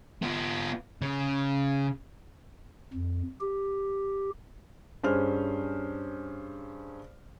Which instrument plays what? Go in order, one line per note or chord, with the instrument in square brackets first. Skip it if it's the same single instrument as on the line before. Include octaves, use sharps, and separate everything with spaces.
[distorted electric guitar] B3 F4
C#3
[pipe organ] F2
G4
[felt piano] G2 C#4 G#4 C5 F6